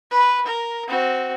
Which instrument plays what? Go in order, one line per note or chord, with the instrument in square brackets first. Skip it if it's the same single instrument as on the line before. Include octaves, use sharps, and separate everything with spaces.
[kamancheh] B4
A#4
C4 F#4